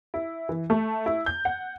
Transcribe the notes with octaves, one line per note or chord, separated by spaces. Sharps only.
E4
E3
A3
E4
G6
F#5